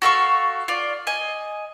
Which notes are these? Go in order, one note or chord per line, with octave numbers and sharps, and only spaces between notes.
F#4 A4 F5 C#6
F4 D5
D#5 G#5